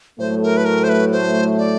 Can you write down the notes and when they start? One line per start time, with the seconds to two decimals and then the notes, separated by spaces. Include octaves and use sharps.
0.19 A2 F#3 A3 C5
0.43 A#4
0.57 B4
0.65 A#4
0.84 C5
0.89 B4
1.12 C5
1.58 D5